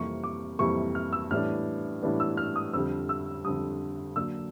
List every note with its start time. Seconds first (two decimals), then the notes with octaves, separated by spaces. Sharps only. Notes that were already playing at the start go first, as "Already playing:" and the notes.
Already playing: F2 C3 E3 G3 A#3 C#6
0.24 D6
0.59 F2 C3 E3 G3 A#3 C#6
0.95 F6
1.13 E6
1.31 A2 E3 G3 B3 D4 F6
2.03 A2 E3 G3 B3 D4
2.20 E6
2.37 F6
2.56 D#6
2.73 F2 D3 G3 E6
3.09 E6
3.44 F2 D3 G3 D#6
4.16 D3 F#3 A#3 D4 E6